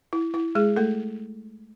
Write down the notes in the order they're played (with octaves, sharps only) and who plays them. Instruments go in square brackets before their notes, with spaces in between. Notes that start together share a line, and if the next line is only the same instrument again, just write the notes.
[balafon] E4
E4
G#3 G#4
A3 A4